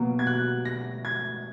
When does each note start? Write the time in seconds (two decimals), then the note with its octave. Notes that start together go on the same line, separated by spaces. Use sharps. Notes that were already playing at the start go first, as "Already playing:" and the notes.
Already playing: B2 F#3 A#3
0.19 G#6
0.27 F#6
0.65 A#6
1.05 G#6